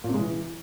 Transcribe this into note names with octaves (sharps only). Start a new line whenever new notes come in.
A#2
C3
G#3
E3